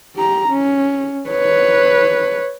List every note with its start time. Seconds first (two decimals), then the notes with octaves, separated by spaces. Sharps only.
0.16 G4 A#5
0.49 C#4
1.29 B4 C#5